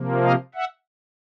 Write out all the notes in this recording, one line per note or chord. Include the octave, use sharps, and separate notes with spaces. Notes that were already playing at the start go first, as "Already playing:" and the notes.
Already playing: C3 F3 A#3
D#5 F5
E5 F#5